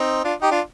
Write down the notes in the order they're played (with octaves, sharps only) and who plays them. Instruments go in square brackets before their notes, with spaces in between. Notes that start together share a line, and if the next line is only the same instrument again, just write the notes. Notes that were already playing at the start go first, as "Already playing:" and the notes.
Already playing: [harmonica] C4 D#4
D4 F4
D#4 G4
D4 F4